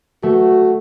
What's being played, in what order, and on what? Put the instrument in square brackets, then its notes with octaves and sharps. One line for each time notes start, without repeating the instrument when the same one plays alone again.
[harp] A3 [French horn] F#4